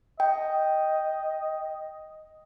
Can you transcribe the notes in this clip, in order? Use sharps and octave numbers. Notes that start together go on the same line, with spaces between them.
D#5 G5